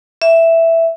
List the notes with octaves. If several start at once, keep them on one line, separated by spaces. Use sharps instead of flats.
E5